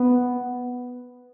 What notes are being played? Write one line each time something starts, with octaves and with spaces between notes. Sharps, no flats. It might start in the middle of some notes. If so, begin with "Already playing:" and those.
Already playing: B3